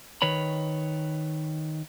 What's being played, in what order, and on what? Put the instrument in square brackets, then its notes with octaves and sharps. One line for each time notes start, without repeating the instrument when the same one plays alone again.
[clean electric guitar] D#3 B4 C#5 B5